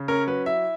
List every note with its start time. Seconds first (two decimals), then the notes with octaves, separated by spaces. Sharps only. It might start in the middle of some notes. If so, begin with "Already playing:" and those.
Already playing: C#3
0.08 C#4 A#4
0.27 F#3 B4
0.46 E4 E5